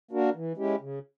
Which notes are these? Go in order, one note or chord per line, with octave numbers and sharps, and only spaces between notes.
A#3 D4 F#4 A#4
E3
G#3 C#4 E4 G4
C#3